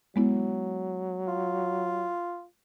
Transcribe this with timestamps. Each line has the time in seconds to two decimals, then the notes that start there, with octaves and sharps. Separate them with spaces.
0.16 F#3 G#3 B3 E4
1.28 F4